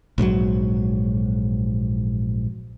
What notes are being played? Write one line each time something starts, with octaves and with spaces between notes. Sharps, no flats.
A#1 G#2 C3 F#3